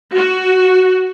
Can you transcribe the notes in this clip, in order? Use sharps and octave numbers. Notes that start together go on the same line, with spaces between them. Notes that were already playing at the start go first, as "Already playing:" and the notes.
F#4